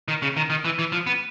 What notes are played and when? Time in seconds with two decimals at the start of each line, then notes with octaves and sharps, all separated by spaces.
0.08 D#3
0.22 C#3
0.37 D#3
0.50 D#3
0.65 E3
0.79 E3
0.92 F3
1.07 B3